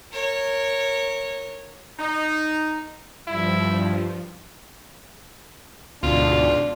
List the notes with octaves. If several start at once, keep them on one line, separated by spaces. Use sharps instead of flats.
A#4 C#5
D#4
G2 F3 E4
D2 G#2 B2 D4 F4